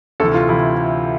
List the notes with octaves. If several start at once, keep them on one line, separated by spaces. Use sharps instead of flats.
D2 C3 E3 A4
F4
C3 E3 E4